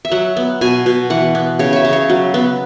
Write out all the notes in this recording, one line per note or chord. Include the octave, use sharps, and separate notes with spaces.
E5
F#3 F#5
B3
B2 G#5
B2
E3 F#5
B3
C#3 C#5
C#5 E5
C#3
C#5
F#3
B3